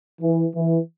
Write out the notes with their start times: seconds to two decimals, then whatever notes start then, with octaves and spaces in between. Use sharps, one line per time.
0.22 E3
0.54 E3